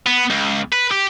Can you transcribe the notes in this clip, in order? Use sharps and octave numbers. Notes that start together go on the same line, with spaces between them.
B3
C#2
B4
G4